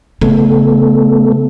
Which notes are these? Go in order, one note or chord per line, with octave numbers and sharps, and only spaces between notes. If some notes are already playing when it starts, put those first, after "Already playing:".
C#3 A3 B3 A4